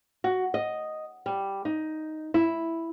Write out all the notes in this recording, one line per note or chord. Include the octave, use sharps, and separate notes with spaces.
F#4
D#5
G3
D#4
E4